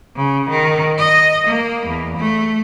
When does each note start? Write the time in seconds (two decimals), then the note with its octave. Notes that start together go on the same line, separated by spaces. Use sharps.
0.16 C#3
0.49 D#3
0.98 D#5
1.46 A#3
1.85 E2
2.16 A3